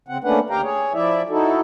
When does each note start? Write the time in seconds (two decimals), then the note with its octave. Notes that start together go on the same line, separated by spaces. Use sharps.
0.08 C#3 C4 F#5
0.24 A3 A#3 C#4 D4 B4 F#5
0.50 D#2 G4 F5 G5 A#5
0.63 G#4 C#5
0.94 F3 E4 D5 E5
1.30 D#4 E4 F#4 A4